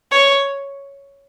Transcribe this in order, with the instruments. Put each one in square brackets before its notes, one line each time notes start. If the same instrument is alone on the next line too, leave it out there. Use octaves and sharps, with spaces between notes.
[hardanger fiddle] C#5